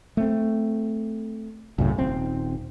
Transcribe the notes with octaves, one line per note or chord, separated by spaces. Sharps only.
A3 C4
C2 F#2 A2 C#3
D#1 C4